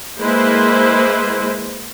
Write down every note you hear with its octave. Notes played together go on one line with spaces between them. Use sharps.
G#3 A#3 E4 B4 C5